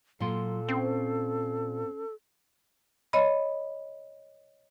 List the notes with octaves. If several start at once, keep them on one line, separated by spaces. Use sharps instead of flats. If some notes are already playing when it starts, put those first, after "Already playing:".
A#2 F#3 F4 A4 C6
C4 C#4 C5
C#5 D#5 B5